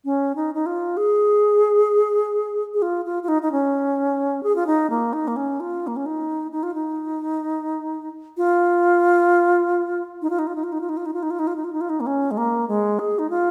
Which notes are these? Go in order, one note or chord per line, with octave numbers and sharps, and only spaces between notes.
C#4
D#4
D#4
F4
G#4
G#4
F4
F4
F4
D#4
D#4
C#4
G#4
F4
D#4
A#3
D#4
A#3
C#4
F4
A#3
C#4
D#4
D#4
F4
D#4
F4
D#4
F4
D#4
F4
D#4
F4
D#4
F4
D#4
F4
D#4
F4
D#4
F4
D#4
F4
D#4
F4
D#4
F4
D#4
A#3
C#4
G#3
A#3
G#3
G#4
D#4
F4